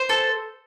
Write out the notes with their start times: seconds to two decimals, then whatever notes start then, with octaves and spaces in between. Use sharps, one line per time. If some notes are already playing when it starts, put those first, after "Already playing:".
Already playing: C5
0.09 A4